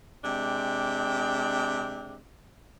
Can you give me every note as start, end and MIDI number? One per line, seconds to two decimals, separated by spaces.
0.24 2.16 48
0.24 2.16 56
0.24 2.16 62
0.24 2.16 79